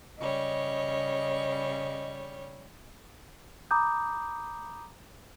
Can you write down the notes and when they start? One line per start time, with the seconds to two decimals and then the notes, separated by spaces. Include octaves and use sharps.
0.19 C#3 G3 C#5 D#5
3.71 A#5 B5 D6 D#6 G6